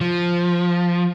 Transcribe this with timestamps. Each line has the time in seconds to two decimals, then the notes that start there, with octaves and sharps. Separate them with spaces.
0.01 F3